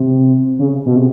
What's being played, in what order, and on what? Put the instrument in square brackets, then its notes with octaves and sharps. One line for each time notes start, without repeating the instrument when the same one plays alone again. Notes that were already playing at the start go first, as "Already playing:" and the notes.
Already playing: [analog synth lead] C3
C#3
B2
C3